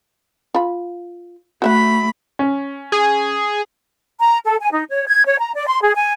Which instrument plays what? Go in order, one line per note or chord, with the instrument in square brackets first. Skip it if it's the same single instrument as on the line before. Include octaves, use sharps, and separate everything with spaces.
[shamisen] F4 B5
[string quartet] A3 B5 [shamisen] F#4 E5 F#5
[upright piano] C#4
[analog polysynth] G#4
[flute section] A#5
A4
G#5
D#4
C#5
G#6
C#5
A#5
D5
C6
G#4
G#5